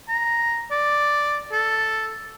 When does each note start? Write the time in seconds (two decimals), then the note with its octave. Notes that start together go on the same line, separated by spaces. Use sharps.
0.09 A#5
0.71 D5
1.52 A4